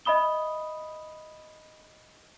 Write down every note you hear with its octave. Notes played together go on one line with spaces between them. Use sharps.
D#5 E5 B5 D#6 G7